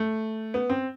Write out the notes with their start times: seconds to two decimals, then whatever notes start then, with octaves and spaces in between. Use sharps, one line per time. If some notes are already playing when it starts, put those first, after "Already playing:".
Already playing: A3
0.54 B3
0.70 C4